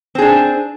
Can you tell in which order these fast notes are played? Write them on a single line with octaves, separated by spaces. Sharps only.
C4 G#4 D4